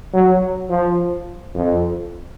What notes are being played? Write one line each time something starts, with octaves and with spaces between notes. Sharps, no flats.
F#3
F3
F2